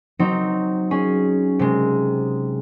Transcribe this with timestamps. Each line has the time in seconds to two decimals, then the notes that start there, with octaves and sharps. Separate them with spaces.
0.19 F#3 C4 D#4
0.91 C#4 G#4
1.59 C3 G#3